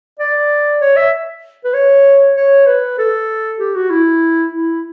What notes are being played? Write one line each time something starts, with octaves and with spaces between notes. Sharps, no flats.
D5
C#5
E5
B4
C#5
C#5
B4
A4
G4
F#4
E4
E4